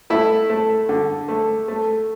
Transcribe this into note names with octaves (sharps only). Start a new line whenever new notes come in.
A3 E4
A3
D3
A3
A3